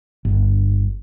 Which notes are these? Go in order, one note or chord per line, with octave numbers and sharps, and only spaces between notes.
G1